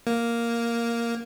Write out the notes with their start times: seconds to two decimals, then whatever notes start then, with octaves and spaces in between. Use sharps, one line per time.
0.07 A#3